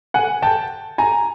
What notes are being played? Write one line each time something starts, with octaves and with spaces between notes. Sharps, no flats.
F#5 G#5
G5 A5
G#5 A#5